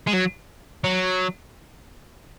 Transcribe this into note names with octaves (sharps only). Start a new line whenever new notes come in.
G#3
F#3
F#3